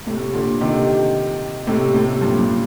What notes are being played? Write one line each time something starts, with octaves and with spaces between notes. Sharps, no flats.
A2 C3
A#2 D3
C3 D#3
A2 C3
A2 C3
G2 A#2
G2